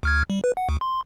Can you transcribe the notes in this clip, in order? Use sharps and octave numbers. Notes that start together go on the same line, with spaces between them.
D2 F6 G#6
G3
B4
F#5
D2
C6